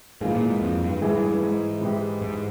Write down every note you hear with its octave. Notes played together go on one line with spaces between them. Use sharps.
G#2 E3 A#3 F4 G#4
A#2
G#2
F2
G2
G#2 E3 G#3 E4 G#4
G2
G2
G#2
E3 G#3 E4 G4
G#2